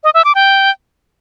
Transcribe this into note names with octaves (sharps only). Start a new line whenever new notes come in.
D#5
E5
D6
G5